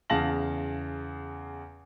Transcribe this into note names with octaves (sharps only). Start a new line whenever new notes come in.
E2 C#3 F5 A5 A#6 F#7